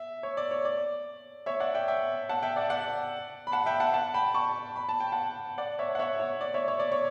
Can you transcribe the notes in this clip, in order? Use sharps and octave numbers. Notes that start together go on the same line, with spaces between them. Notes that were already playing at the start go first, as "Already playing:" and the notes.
Already playing: E5
C#5
D5
C#5
D5
C#5 E5
D5 F#5
E5 G5
E5 G5
F#5 A5
E5 G5
D5 F#5
D5 F#5
B5
F#5 A5
E5 G5
F#5 A5
F#5 A5
G5 B5
A5 C#6
B5
A5
G5
F#5 A5
D5 F#5
C#5 E5
F#5
C#5 E5
C#5
D5
C#5 E5
C#5
D5
C#5